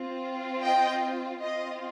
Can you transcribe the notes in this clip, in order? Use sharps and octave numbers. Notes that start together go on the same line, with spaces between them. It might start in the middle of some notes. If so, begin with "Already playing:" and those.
Already playing: C4 F4
D#5 G5
C4 F4 D#5